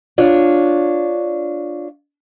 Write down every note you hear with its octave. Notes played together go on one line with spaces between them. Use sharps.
D4 F4 C#5